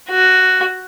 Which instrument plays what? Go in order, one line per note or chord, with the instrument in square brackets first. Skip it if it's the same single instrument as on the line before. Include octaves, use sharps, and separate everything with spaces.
[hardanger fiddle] F#4